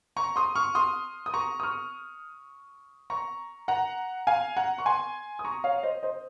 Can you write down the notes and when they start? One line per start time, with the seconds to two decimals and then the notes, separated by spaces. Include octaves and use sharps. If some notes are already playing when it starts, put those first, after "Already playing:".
0.17 A#5 C#6
0.36 C6 D#6
0.55 C#6 F6
0.75 C6 D#6
1.26 D#6
1.34 A#5 C#6
1.60 D#6
1.63 C#6 F6
3.10 A#5 C#6
3.68 F#5 A#5
4.27 F5 G#5
4.56 F#5 A#5
4.78 C#6
4.86 G#5 C6
5.39 D#6
5.45 A#5 C#6
5.64 C#5 F5
5.83 C5 D#5
6.03 C5 D#5